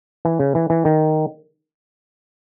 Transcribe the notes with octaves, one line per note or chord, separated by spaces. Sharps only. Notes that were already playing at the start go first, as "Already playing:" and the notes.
E3
C#3
E3
E3
D#3